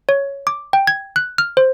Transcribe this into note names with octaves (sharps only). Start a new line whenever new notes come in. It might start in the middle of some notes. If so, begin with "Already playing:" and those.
C#5
D6
G5
G#6
F#6
F6
C5